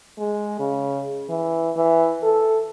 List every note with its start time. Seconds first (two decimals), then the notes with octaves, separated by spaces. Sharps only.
0.19 G#3
0.60 C#3
1.30 E3
1.77 E3
2.23 A4